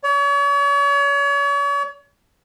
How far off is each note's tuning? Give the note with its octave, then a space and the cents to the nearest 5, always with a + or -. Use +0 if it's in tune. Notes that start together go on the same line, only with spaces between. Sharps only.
C#5 +40